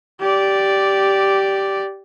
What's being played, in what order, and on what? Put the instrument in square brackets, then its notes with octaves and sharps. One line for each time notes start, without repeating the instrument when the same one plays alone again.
[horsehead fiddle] G4 D5